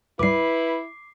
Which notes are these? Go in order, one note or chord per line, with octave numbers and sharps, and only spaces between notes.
D2 G#2 G3 E4 B4 D6 C7